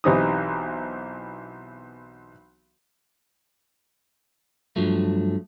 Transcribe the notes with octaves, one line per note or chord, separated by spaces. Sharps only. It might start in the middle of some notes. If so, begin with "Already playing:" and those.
B1 E3 C4 D#4 G4 D#6
G2 F3 F#3 A3